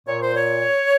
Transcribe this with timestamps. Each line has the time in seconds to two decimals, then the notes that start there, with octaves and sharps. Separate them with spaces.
0.06 A#2 C#5
0.20 C5
0.35 C#5